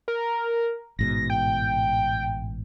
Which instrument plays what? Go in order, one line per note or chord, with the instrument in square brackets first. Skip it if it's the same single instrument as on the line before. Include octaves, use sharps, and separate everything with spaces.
[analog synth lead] A#4
[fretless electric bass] A1 G#2 B2 [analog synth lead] A#6
[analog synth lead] G5